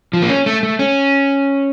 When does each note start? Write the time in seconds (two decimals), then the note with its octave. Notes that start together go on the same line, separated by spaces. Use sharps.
0.13 F3
0.22 A#3
0.29 C#4
0.46 A3
0.63 A3
0.79 C#4